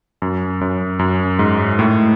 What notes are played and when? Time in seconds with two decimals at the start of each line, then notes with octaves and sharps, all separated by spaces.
0.22 F#2
0.61 F#2
0.99 F#2
1.39 G#2
1.79 A2